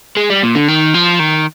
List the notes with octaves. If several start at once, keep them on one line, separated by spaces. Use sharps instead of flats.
G#3
G3
A#2
D3
D#3
F3
D#3